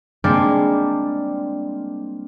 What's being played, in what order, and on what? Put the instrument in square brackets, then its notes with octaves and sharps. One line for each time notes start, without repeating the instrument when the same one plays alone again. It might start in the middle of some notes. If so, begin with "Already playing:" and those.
[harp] G3 G#3 A#3 C4 D4